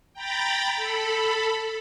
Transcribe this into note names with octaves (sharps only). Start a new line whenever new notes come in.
G5 A#5 B5 A6
A4 B5